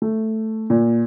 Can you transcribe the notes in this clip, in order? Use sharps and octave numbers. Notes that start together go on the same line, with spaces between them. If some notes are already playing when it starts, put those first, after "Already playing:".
A3
A#2